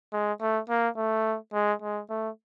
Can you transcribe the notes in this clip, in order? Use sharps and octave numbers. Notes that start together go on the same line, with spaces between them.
G#3
A3
A#3
A3
G#3
G#3
A3